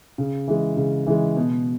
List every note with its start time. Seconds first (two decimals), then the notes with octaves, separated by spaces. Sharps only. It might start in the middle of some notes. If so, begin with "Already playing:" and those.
0.18 C#3
0.48 E3 G#3
0.77 C#3
1.06 E3 G#3
1.37 B2